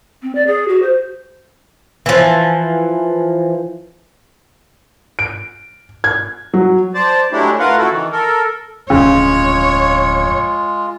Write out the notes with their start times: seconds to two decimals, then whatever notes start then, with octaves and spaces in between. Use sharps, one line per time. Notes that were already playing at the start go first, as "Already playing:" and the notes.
0.22 C4
0.35 D5
0.47 G#4
0.68 F#4
0.82 C5
2.06 E3 F3
5.19 D7
6.04 G#6
6.54 F#3
6.94 C5 D5 A5
7.32 F#3 G#3 A3 D4 E4 G4
7.60 A3 F4 A#4 B4 F5 F#5
7.78 C#3 E4 F#4 A4
7.91 D#3 E3
8.12 A4 A#4
8.90 D1 F2 C#3 G#3 C#4 F4 C#5